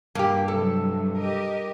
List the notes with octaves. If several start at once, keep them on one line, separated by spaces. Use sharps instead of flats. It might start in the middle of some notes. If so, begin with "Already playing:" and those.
G2 A#3 G4
C3 F#3 A4
G4 A#4 D#5